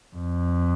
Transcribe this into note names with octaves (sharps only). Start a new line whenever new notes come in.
F2